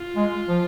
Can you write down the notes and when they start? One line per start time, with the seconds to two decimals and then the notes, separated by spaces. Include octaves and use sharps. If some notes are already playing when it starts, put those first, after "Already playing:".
Already playing: F4
0.16 G#3
0.48 F3